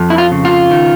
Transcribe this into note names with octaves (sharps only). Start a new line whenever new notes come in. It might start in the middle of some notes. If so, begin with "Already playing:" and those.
Already playing: F2
E4
F4
C#3
F4
D#3